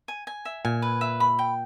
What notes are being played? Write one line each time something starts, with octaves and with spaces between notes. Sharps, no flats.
G#5
G#5
E5
A#2 G#5
B4
E5
B5
G5